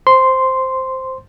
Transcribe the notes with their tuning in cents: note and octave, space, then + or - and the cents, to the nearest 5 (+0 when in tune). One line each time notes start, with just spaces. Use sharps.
C5 +0 C6 -5